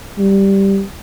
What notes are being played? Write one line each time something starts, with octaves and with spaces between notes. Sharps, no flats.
G3